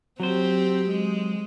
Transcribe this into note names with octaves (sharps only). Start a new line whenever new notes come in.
F#3 C4 G4 C5
G#3